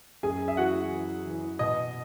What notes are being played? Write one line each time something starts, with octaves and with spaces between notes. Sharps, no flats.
F#2 G#4 G#5
E5
E3 F#4 F#5
E3
E3
B2 D#5